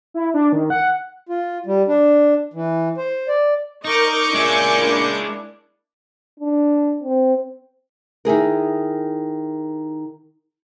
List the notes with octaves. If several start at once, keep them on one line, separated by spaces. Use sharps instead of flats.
E4
D4
D#3
F#5
F4
G3
D4
E3
C5
D5
D#4 A#4 D5 D#5 C#6 D6 G6
A#2 G#3 C#4 D4 E5 G#5
A#3 D4 E4
D4
C4
D#3 E4 G#4 A#4